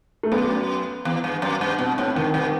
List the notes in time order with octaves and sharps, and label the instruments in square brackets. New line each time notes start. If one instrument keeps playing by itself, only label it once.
[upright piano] A3
[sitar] F#2 [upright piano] B3
[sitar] E2
G2
F#2
G2
[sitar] B2 [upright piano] C4
[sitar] A2 [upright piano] C4
[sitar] G2 [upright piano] D#3
[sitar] G2 [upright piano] D#3